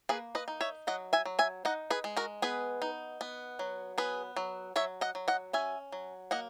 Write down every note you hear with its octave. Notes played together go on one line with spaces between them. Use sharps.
A#3 G#4 B4
B4 D#5
D#4
C#5 E5
F#3 D#5 F#5
E5 G#5
F#3
E5 G#5
D#4 D#5 F#5
G#4 B4
G#3
F#4 A#4
B3 G#4 B4
D#4
B3
F#3
B3 G#4 B4
F#3
F#3 C#5 E5
D#5 F#5
F#3
D#5 F#5
C#4 E5 G#5
F#3
A#3 D#5 F#5